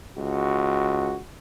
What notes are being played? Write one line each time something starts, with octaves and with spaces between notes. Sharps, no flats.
C#2 F#4